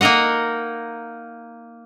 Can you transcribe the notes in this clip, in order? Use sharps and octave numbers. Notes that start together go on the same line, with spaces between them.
A#3 D#4 A#4 D#5 F#5